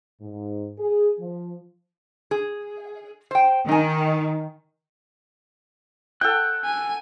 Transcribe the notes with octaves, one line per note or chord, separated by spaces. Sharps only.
G#2
G#4
F3
G#4
C5 G5
D#3 D#4 G#5
A4 F#5 G5 F#6
G#5